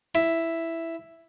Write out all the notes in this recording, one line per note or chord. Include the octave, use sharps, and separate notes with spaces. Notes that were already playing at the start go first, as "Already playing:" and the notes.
E4